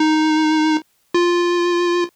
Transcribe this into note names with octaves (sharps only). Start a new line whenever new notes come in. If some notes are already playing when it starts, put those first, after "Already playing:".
Already playing: D#4
F4